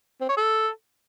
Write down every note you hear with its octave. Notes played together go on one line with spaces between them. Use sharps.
C4
C#5
A4